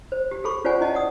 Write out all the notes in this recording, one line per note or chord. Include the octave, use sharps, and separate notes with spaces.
C5
G4
G#4 A4 B5 C#6
C#4 F4 C5 D5 F#5 G#5
E4 D#5 G5 A5
D5 F#5 D#6